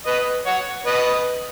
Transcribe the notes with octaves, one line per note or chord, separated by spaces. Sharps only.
B4 D#5
C#5 F#5
B4 D#5